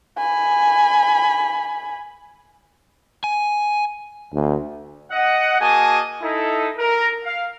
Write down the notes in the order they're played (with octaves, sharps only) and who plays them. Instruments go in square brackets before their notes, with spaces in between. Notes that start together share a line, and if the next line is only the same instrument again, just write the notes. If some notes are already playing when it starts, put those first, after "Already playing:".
[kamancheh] G#5 B5
[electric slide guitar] G#5
[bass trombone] D2
[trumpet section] D#5 F#5
A#3 F#4 G#4 D#5 G#5 A5
D#4 E4 A4
A#4
F5